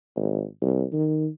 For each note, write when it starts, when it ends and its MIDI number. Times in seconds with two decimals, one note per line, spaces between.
0.16 0.44 32
0.62 0.83 36
0.93 1.28 51